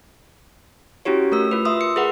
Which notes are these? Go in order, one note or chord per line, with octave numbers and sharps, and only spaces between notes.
C#4 E4 F#4 G4 C#5
A3 A#4 E6
F4 B4
E5 C6 D#6 E6
C#7
G#4 A#4 B4 F#5